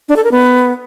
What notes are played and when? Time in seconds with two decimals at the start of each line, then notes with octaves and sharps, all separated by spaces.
0.09 D4
0.16 A4
0.24 A#4
0.32 B3